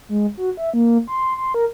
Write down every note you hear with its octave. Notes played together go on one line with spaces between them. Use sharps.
G#3
F#4
E5
A#3
C6
C6
A#4